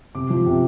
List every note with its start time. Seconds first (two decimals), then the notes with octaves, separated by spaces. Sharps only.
0.15 C3 D6
0.30 F3
0.46 C3